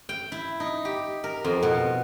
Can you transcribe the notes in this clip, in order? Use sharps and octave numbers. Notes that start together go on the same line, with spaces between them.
G5
E4
D#4
G4
A#4
F2
B2